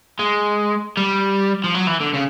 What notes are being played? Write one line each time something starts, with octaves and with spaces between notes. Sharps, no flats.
G#3
G3
F3
F#3
E3
D3
C#3